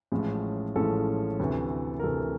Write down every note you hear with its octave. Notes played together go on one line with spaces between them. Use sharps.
A1 A2 F3 G#3 C#4
A1 A2 F3 G#3 C#4 A4
D2 C3 E3
A#4
D2 C3 E3 A4